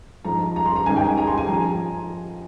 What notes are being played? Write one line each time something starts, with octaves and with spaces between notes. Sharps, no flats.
G#2 F3 A#5
A#5
C6
A#5
G#2 D#3 G#5
G5
G#5
A#5
C6
G#5
F3 A#5